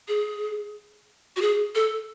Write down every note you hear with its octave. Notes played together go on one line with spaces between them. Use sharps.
G#4
F#4
G#4
A4